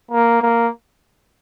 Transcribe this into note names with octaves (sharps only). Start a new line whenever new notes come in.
A#3
A#3